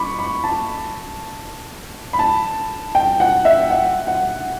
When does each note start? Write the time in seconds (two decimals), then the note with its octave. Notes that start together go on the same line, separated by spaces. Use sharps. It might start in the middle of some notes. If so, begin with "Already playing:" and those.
Already playing: B5 C#6 D6
0.19 B5
0.44 A5
2.13 B5
2.19 A5
2.95 G5
3.20 F#5
3.45 E5
3.70 F#5
4.07 F#5